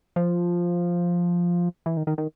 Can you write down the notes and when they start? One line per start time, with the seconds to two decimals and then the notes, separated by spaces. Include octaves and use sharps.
0.16 F3
1.86 E3
1.97 D#3
2.07 D#3
2.18 D#3